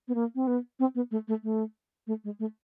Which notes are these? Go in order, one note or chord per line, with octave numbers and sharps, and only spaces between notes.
B3
A#3
C4
B3
C4
B3
A3
A3
A3
A3
G#3
A3